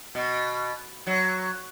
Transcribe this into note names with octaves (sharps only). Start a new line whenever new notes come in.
B2
F#3